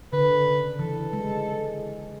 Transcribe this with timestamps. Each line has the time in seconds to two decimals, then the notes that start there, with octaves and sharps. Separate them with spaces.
0.13 D3 B4
0.46 C#3
0.79 E3 A4
1.13 G#3